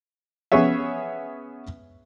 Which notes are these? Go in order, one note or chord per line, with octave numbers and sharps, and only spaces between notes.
B3 C#4 G#4 C#5 E5